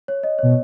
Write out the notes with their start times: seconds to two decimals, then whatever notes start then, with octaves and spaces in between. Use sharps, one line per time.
0.08 C#5
0.23 D#5
0.39 C#5
0.43 B2